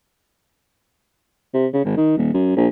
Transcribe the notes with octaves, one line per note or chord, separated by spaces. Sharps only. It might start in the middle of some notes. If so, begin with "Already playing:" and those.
C3
C#3
G#1
D#3
D#1
F#2
A#1